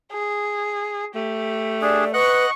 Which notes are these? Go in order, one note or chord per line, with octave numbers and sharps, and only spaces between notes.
G#4
A3 G4
D4 G#4 D5
B4 D#5 F#5 C#6 F#6